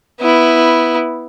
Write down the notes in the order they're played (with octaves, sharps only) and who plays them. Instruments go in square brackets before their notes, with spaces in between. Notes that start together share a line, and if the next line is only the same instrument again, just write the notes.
[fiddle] B3 E4